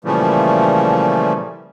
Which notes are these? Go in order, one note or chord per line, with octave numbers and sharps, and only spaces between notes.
A#2 C#3 E3 F3 G3 A3